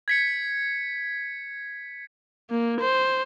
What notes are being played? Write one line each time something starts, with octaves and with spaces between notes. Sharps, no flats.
G#6 B6 C#7
A#3
C5